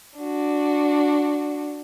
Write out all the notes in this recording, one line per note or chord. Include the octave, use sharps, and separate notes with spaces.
D4 F#4